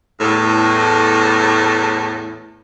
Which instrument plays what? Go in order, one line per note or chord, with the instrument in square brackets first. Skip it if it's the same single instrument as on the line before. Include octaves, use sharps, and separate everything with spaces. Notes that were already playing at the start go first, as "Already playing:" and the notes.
[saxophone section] E2 A2